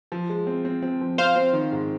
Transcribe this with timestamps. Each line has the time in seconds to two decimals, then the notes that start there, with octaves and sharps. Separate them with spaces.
0.12 F3
0.30 G#3
0.47 C4
0.65 C4
0.82 C4
1.01 F3
1.18 C4 C5 F5
1.36 C4
1.53 D#3
1.72 G#2